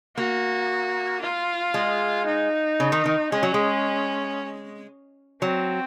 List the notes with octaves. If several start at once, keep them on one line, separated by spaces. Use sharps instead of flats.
A#3 F#4
F4
G#3
D#4
C#3
D#3
D#3
G#3 C#4
F#3
G#3
F#3 C4